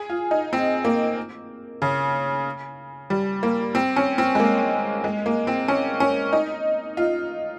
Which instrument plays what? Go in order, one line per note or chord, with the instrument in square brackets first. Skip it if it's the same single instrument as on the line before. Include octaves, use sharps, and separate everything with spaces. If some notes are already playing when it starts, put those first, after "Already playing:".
Already playing: [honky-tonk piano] G#4
F4
D#4
C4
A#3
C#3
G3
A#3
C4
C#4
C4
G#3
A#3
G#3
A#3
C4
C#4
C#4
D#4
F4